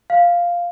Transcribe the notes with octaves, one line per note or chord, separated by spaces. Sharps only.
F5